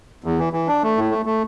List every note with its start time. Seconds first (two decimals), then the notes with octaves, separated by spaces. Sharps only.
0.24 E2
0.39 E3
0.53 E3
0.68 D4
0.83 A3
0.97 A2
1.11 A3
1.26 A3